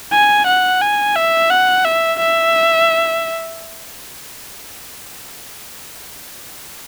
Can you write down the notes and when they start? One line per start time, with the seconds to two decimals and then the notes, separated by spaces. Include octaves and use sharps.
0.12 G#5
0.47 F#5
0.81 G#5
1.16 E5
1.50 F#5
1.85 E5
2.19 E5